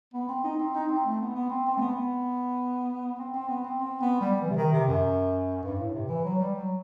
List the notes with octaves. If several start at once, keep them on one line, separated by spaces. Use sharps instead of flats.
B3
C4
D#4
C4
D#4
C4
A3
B3
B3
C4
C4
A3
B3
B3
C4
C4
B3
C4
C4
B3
G3
E3
C3
D#3
C3
F#2
G2
A2
C3
E3
F#3
G3
F#3